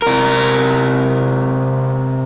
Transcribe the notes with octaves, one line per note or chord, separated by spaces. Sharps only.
C3 A#4